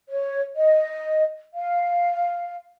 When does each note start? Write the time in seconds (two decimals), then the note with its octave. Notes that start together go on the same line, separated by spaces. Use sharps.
0.10 C#5
0.55 D#5
1.55 F5